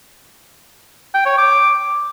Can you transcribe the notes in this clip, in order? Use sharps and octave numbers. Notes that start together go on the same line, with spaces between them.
G5
C#5
D6